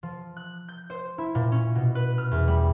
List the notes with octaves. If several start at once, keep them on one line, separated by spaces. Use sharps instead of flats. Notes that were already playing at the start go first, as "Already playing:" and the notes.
F3
F#6
G6
C5
E4
A#2
C#4
B2
B4
F6
E2
G3